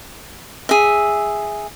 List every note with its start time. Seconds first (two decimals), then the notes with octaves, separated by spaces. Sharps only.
0.69 G#4 E5